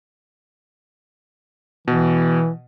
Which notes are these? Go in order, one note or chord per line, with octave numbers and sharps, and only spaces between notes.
B2 E3